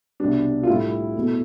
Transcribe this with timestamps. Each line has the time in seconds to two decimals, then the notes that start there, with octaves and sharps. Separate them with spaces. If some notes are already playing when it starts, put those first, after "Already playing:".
0.20 C2 B2 G3 D4
0.63 F4
0.68 A2 G3 E4
1.15 E2 B2 A3